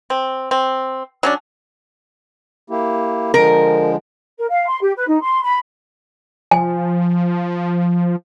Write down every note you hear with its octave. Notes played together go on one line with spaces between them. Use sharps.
C4
C4
F#3 C#4 D4
A#3 E4 G4
D3 F3 G#3 A#4
A#4
F5
C6
G4
B4
D#4
C6
B5
F3 G#5